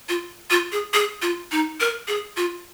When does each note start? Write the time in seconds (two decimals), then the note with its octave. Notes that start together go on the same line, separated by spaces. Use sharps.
0.09 F4
0.51 F4
0.72 G#4
0.94 G#4
1.22 F4
1.52 D#4
1.80 A#4
2.08 G#4
2.37 F4